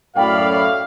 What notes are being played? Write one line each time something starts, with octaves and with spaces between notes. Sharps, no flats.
F#2 A2 D5 F5 G5 B5